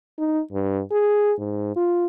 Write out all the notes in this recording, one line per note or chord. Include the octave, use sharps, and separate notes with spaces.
D#4
G2
G#4
G#2
F4